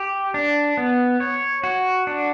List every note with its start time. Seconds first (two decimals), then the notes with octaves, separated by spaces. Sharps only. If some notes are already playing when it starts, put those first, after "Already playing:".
Already playing: G4
0.34 D4
0.77 B3
1.20 C#5
1.64 F#4
2.07 D4